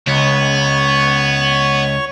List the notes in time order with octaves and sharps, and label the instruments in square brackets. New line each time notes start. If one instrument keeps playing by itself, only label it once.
[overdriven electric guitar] C#2 [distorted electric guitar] B3 [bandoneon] C#5 C#6